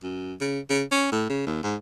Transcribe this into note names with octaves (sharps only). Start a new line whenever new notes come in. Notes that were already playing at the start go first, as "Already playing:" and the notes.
F#2
C#3
C#3
C#4
A2
C#3
D#2
G#2